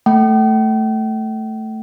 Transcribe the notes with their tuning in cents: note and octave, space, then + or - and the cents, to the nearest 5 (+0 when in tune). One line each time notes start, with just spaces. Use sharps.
A3 +0 G5 -40